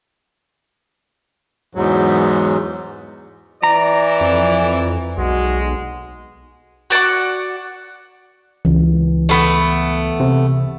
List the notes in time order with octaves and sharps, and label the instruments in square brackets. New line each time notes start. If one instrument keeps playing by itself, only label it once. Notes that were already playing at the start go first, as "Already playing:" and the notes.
[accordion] E2 G#2 F#3
[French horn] E3 [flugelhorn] D5 [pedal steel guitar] A#5
[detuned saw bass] F2
[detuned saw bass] B1 [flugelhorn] G#3 [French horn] F#4
[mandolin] F#4 D5 F#5 C#6
[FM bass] C#2 [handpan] E3
[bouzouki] A3 B3
[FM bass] C3